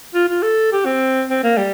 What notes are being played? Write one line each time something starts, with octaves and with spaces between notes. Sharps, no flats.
F4
F4
A4
G4
C4
C4
A#3
G3